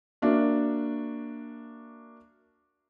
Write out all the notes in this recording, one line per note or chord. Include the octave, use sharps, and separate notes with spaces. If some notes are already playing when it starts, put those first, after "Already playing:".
A#3 D4 F#4 E5